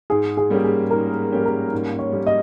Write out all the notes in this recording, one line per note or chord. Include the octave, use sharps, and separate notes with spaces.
G#2 G#4
G#4
G3 A#3 C#4 G4
G#4
G#2 A#4
G3 A#3 C#4 G4
A#4
G#2
C#5
G3 A#3 C#4 G4
D#5